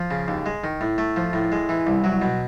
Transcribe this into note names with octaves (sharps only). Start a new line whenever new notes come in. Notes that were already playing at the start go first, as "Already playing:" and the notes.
Already playing: F3
C#3
D#2
G#3
D#3
A2
A3
F3
A2
G#3
E3
C2
F#3
B2